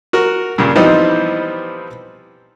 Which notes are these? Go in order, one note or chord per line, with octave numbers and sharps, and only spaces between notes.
F#4 A#4
G2 A#2 C#3
E3 F3 G3 B3 C4 D#4